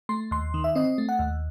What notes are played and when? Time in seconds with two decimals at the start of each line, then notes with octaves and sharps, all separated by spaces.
0.09 A3 C6
0.31 D#2 C6
0.54 D#3
0.64 E5
0.75 C4 D#5
0.98 A3
1.09 F#5
1.19 D#2